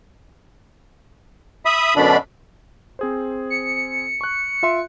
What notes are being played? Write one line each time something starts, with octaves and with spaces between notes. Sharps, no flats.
E5 B5 D#6
F#2 B2 D3 D4 B5
C4 G#4 C5
C#7
C#6 F#6
F4 E5 C6